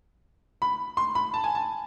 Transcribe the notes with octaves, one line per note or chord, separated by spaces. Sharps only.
B5
C6
B5
A5
G#5
A5